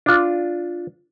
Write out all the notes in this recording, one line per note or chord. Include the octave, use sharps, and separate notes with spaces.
D4 F4